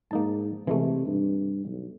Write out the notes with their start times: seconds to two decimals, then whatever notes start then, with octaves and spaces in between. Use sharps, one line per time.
0.11 G#2 A#3 D#4 A5
0.67 C3 E3 G#3 A3
1.06 G2
1.65 B1